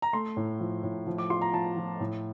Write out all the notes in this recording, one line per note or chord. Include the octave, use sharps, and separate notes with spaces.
A#5
A3 C6
A2
F3
A2
F3
D6
F4 C6
A#5
F3 A5
F3
A2